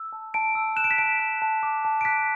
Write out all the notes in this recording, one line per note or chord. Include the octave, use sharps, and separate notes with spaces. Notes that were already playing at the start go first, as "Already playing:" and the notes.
Already playing: E6
A5
A5 D7
E6
F#6 E7
D7
B6
A5 D7
F#6
A5
D6
A5
D7
F#6 B6